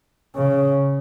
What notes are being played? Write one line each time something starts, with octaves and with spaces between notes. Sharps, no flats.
C#3